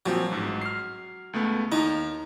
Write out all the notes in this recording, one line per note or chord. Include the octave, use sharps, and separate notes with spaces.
A#2 F3 F#3 C4
A1 G#2
F6 C7
C#2 A3 B3
D#2 D#4 A#5